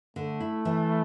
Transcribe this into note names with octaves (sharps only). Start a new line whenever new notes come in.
D3 A3
E4
E3